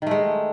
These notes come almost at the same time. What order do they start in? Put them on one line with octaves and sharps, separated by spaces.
D#3 A3 G#3